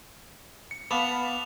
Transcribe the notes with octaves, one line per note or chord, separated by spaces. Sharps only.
C#7
B3 F5 A5 B5 D6 F7